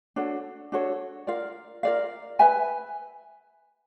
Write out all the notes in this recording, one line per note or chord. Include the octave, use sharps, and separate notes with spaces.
D4 F#4 A4 C#5
D4 F#4 A4 C#5
F4 A#4 D5 F5
F4 A#4 D5 F5
B4 E5 G#5 B5